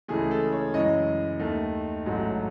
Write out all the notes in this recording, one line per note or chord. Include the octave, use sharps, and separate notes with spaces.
C#2 C#3 E3 A3 G#4
A4
C#5
F#2 E3 G#3 D#5
D#2 D#3 A3
A1 G#2 F#3 A3